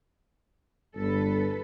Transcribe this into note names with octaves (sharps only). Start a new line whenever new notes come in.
G1 A4 B4